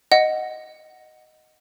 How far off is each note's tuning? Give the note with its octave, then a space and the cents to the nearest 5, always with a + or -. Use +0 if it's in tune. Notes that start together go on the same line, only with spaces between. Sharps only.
D#5 +0 F#5 +0